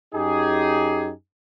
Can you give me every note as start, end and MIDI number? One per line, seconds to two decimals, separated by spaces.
0.14 1.11 42
0.14 1.11 63
0.14 1.11 67
0.14 1.11 68